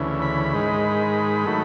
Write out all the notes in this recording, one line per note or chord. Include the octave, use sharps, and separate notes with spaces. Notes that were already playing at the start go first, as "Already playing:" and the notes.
Already playing: D2 C#3 E3
B5
G#2 D#3 G#3
D#3 F#3 A3